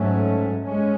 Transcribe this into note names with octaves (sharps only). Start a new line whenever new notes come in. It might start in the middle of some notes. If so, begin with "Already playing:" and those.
Already playing: G#2 F#3 A3 C#4
G#3 C#4